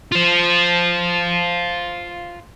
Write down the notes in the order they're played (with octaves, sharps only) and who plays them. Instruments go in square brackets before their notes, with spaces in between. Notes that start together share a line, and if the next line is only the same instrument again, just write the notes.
[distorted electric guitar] F4 C5